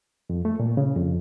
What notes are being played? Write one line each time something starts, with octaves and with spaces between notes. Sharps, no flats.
F2
A3
A#2
C#3
F2